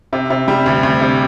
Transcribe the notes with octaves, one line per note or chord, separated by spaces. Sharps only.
C3
C3
G3
D2
D2
C3